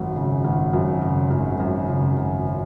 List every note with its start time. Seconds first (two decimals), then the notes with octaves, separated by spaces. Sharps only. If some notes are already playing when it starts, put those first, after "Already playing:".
Already playing: G#1 F#2
0.16 C#3
0.44 G#1
0.73 F#2
1.02 C#3
1.30 G#1
1.60 F#2
1.89 C#3
2.18 G#1